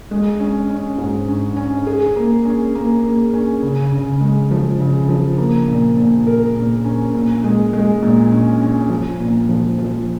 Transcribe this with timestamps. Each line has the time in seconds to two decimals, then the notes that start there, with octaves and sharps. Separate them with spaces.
0.11 G#3
0.40 C#4
0.70 C#4
0.98 G#2
1.28 C#4
1.57 C#4
1.86 G#4
2.16 A#3
2.45 C#4
2.75 A#3
3.04 A#3
3.34 C#4
3.62 C#3
3.92 C#3
4.21 G#3
4.51 F3
4.80 C#3
5.09 F3
5.38 A#3
5.68 A#2
5.97 A#2
6.27 A#4
6.56 A#2
6.85 C#4
7.14 A#2
7.44 G#3
7.73 G#3
8.02 A#2
8.32 C#4
8.61 C#4
8.90 F3
9.20 A#2
9.49 F3
9.78 F3